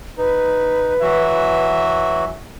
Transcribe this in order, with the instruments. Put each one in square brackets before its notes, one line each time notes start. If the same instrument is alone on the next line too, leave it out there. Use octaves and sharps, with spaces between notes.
[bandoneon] D#4 [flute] B4
[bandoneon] E3 F#3 F#4 [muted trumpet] E5